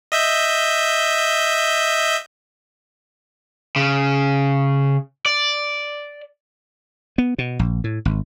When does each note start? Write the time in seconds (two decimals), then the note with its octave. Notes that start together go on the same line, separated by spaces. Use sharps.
0.12 D#5 E5 G6
3.76 C#3
5.26 D5
7.18 B3
7.38 B2
7.59 A#1
7.84 A2
8.05 G#1